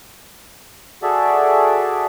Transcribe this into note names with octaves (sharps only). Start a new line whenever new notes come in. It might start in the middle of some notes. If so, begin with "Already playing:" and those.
F#4 G#4 A4 D5 E5